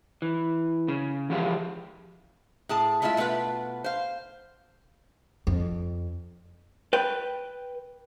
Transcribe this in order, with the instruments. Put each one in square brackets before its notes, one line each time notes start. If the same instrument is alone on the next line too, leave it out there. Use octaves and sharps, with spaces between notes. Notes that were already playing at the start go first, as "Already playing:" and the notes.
[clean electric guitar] E3
C#3
E3 F3 G4 G#4 E5 F5
[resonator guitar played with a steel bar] A2 G#4 A5
G#3 A3 E4 F4 E5
B2 A3 B3 F4 B4
C5 F5
[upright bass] F2
[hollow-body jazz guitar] B4 G5